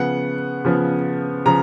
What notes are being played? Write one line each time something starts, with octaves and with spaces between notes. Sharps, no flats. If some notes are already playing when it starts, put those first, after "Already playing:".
Already playing: C#3 F3 B3 F#5
C#3 F3 B3
C#3 F3 A#5